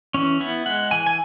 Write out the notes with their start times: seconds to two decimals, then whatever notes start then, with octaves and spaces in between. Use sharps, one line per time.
0.14 E3 C#4
0.41 B3 E4
0.66 G#3 F#5
0.91 E3 G#5
1.07 G#5